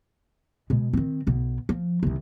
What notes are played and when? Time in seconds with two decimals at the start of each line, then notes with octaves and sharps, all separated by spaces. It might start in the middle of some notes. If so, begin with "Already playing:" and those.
0.70 B2 G#3
0.93 D#3 C4
1.27 B1 B2
1.69 F3
2.03 C2 D#3